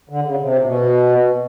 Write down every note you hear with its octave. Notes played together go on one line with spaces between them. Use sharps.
D3
C#3
C3
A#2
B2